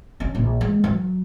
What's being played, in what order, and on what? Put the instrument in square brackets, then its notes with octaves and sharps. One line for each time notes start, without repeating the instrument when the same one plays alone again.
[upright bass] C#4
A#1
G#3
F#3